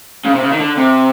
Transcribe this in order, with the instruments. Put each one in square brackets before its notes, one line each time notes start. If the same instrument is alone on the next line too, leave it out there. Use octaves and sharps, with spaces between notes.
[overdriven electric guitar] C#3
C3
C#3
D#3
D3
C3